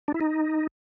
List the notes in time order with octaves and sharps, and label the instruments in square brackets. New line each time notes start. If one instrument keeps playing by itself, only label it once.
[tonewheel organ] D4
E4
D#4